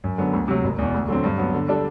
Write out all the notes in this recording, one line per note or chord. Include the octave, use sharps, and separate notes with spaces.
F#2
D3 F#3 B3
D2
C3 F#3
F#1
E2 B2
D2
D3 F#3 C4
G2
F#3 B3
D3
G3 D4 A4